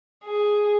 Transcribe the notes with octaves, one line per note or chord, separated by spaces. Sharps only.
G#4